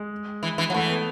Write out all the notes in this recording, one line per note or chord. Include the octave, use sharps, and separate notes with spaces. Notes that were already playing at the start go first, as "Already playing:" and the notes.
Already playing: G#3
E3
E3
F#3
E3 A3
B3